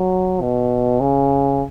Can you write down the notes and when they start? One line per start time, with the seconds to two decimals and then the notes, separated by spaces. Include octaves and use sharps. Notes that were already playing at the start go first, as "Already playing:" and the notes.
Already playing: F#3
0.42 B2
1.01 C#3